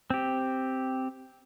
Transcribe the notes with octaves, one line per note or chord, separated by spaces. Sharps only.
C4 G4